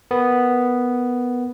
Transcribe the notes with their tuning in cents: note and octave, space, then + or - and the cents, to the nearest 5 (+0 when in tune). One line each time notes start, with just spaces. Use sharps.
B3 +0 A#4 +0